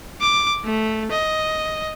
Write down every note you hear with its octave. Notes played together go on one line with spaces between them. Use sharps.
D6
A3
D#5